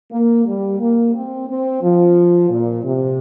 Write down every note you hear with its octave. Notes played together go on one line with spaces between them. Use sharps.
A#3
G3
A#3
C4
C4
F3
A#2
C3